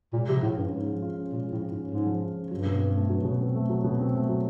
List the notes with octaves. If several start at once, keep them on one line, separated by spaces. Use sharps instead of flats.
A#2 G#3
C3 F3
A2 F4
G2 C#4
G#2 G#3
F3
F4
C#4
A#2 G#3
F3
A2
F4
G#2
C#4
G#2 G#3
F3
F4
C#4
G2 F#3
B2
C4
A3
F#3
B2
C4
A3
F#3
B2
C4
A3
F#3